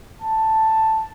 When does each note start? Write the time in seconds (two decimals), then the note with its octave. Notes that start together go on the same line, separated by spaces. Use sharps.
0.22 A5